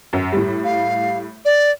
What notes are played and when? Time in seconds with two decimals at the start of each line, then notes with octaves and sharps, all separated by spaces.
0.13 F#2
0.32 A2 G3
0.64 F5
1.45 D5